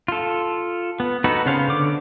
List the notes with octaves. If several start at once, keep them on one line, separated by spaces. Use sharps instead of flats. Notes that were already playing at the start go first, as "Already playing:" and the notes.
F4 A4
B3
B3 D#4 F#4 A4 B4
C#3 B3 C5 C#5 F5
D3 D6